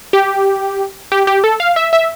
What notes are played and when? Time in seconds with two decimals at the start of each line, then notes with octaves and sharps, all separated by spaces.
0.13 G4
1.12 G4
1.27 G4
1.44 A4
1.60 F5
1.76 E5
1.93 E5